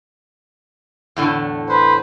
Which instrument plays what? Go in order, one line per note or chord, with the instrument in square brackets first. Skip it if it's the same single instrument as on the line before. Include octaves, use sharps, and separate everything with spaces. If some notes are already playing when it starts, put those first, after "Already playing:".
[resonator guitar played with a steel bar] E2 A2 D3
[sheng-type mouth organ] B4 C5